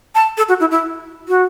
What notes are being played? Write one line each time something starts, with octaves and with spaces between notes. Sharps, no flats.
A5
A4
F#4
E4
E4
F#4